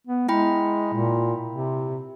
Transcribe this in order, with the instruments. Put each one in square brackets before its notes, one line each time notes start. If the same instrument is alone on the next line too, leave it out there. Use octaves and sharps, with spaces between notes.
[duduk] B3
[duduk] G#3 [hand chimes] E4 G5 B5
[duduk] A#2
C3